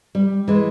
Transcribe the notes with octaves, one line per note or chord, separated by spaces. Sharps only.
G3
E3 G#3